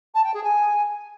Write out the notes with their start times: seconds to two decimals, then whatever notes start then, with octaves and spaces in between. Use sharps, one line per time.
0.15 A5
0.24 G5
0.34 G#4
0.44 G#5